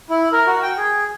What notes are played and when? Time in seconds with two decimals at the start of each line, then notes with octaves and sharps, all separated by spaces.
0.10 E4
0.32 A#4
0.47 F#4
0.62 G5
0.78 G#4